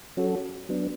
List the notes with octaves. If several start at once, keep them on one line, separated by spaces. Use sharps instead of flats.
F#3 C#4 F#4 A4
F#3 B3 D4